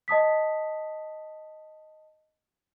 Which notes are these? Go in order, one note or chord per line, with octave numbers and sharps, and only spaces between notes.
D#5 A5 D#6 B6